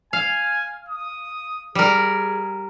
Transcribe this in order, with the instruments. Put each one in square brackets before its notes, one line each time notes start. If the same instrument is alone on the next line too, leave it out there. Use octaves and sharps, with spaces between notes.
[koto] F5 [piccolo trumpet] G#5
[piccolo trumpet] D#6
[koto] G3 A#4 [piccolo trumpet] G#4